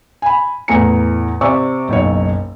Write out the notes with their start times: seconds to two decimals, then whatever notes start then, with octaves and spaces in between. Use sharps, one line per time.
0.22 G#5 B5
0.68 E2 A2 A3 G#5 A#5 C#7
1.41 C3 C5 D5 C#6 E6
1.89 F#1 B1 C#5